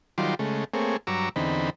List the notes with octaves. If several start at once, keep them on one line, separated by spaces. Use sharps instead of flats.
D#3 F#3 G3 F4 C6 D6
C#3 G#3 A3
A3 A#3 C4 G#4 C#5
G2 F#3 A#5 C#6 D6 E6
E2 D3 C4 D#4 B5